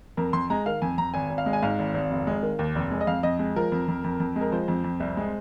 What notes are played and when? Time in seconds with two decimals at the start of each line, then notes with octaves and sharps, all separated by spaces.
0.17 F2 A#4
0.33 F2 C6
0.50 G#3 A#5
0.66 D#3 F5
0.82 F2 G#5
0.98 F2 A#5
1.14 G#1 G#5
1.30 G#1
1.38 F5
1.46 G#3
1.53 G#5
1.63 G#2 F5
1.79 G#1
1.94 G#1
2.11 F1
2.27 G#3
2.43 D#3
2.59 D#2
2.75 F1
2.91 G#3
3.01 D#5
3.07 F2 F5
3.23 F2 D#5
3.39 G#3
3.56 F3 A#4
3.72 F2
3.88 F2
4.04 F2
4.20 F2
4.36 G#3
4.41 A#4
4.52 F3 C5
4.68 F2
4.84 F2
5.00 C2
5.17 G#3